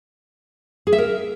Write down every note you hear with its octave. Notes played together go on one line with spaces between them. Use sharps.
G#4
E5
A#4